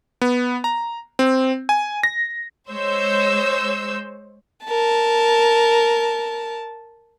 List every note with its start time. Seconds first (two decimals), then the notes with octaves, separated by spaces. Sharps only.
0.21 B3
0.64 A#5
1.19 C4
1.69 G#5
2.03 A#6
2.70 G#3 C5 C#5 E6 G6
4.65 A#4 A5